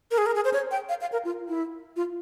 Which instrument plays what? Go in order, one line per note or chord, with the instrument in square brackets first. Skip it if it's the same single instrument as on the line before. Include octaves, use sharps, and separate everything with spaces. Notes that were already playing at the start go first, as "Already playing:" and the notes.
[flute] A#4
G#4
A#4
G#4
C5
C#5
G5
F5
F5
A#4
F4
E4
F4